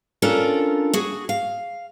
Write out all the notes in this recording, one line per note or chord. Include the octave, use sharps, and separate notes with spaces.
C#4 D4 F4 A4 A#4
F#4 G#4
F5